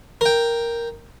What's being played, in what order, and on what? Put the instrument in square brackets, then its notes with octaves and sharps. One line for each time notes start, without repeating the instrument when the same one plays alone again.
[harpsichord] A#4 G5